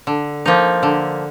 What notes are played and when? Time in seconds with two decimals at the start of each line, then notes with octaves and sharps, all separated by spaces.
0.07 D3
0.46 F3 A#3 D#4
0.83 D3